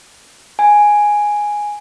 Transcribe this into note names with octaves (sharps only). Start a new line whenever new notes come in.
G#5